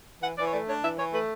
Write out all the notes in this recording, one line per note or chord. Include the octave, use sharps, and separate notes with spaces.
E3 F#5
E3 D5
C#5
A3 D5
D4 C#5
E3 E5
E3 C#5
A3 B4